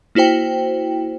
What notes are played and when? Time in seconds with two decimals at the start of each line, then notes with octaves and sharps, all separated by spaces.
0.15 A#3 E4 F#4 C5 G5